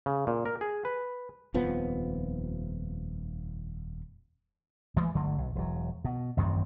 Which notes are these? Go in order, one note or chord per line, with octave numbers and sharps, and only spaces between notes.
C#3
A#2
A#4
G#4
B4
D#1 F2 F3 B3
E3 G#3 A3
G1 D3 F#3 A3
B1
E1 F#3
B2
A1 F#2 D#3 C4